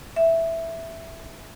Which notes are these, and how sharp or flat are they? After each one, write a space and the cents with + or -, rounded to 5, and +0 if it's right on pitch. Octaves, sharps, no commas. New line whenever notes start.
E5 +0